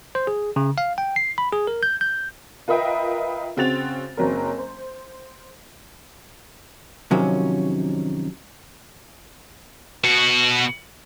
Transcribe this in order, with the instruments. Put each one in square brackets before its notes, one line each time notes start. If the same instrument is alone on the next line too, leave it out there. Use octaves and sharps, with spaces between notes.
[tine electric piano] C5
G#4
C#3
F5
G5
C7
B5
G#4
A#4
G6
G6
[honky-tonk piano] F4 A#4 B4 D#5 E5 G5
C#3 C4 F#4 A6 F7
F#1 F#3 C4 C#4 A#4
C5
[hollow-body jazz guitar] F#2 C3 D#3 F3 F#3 C#4
[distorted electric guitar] B2 F#4